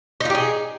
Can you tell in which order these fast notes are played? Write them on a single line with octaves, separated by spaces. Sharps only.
D#4 F4 G4 G#4